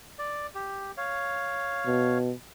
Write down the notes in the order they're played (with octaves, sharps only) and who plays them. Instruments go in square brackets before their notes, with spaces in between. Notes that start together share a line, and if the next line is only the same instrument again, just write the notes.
[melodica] D5
G4
C#5 F5
[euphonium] B2